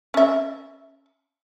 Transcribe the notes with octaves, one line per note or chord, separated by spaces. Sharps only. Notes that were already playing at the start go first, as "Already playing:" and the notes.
C#4 E5